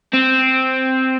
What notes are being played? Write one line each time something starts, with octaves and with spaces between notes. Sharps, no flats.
C4